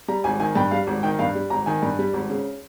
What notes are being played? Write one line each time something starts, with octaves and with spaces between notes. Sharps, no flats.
G3 A#5
G#1 G#5
D#3 G#5
G2 G5
G3 F5
G#1
D#3 G5
G2 F5
G3
G#1 A#5
D#3 G#5
G2
G3
G#1
C#3